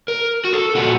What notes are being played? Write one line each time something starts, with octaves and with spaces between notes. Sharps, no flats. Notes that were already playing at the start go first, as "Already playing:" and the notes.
A#4
F#4
A4
A#2 F3 F#4